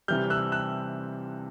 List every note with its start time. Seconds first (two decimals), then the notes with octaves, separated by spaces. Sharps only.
0.08 C3 E3 G3 F6 G6
0.30 E6 F#6
0.52 E6 F#6